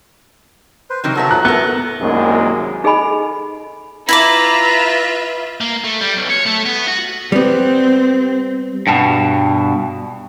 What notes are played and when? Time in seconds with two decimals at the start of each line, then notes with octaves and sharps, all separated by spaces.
0.90 B4 C5
1.04 C3 D#3 F#3 A#4 G5
1.15 F#3 B3 F#4 A4 A#4 E5
1.29 A#5 F#6
1.45 B3 E4 A4 A#4 F#6
2.01 C2 F#2 D#3 G#3 A#3
2.84 D#4 G#4 A4 D#5 G#5 B5
4.09 E4 F4 B4 E5 A#5 B5 D6
5.61 A#3
5.84 A3
6.01 G3
6.17 B1
6.30 C#5
6.46 A3
6.65 B3
6.88 F#4
7.32 G3 B3 C4
8.87 G2 B2